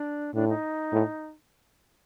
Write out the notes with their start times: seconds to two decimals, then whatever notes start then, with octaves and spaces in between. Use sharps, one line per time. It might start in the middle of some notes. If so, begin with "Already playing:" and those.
Already playing: D4
0.35 A2 D4
0.49 D#4
0.93 A2